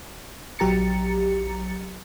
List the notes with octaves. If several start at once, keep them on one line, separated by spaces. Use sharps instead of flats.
A#1 F#3 G4 A#5 A6 C#7